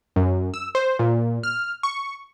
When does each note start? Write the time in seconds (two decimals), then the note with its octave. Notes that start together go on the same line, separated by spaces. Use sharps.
0.16 F#2
0.54 E6
0.75 C5
0.99 A#2
1.43 F6
1.83 C#6